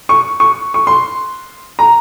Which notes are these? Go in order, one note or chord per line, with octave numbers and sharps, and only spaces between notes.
C#6
C#6
C#6
C6
A#5